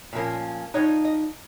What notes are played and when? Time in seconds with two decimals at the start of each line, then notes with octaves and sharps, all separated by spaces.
0.13 A#2 F3 A#3 C#4
0.74 F3 G#3 D#4 C#5
1.05 D#5